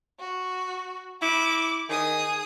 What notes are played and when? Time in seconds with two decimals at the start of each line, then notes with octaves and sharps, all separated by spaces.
0.20 F#4
1.22 E4 D6
1.89 D#3 G#4 D#6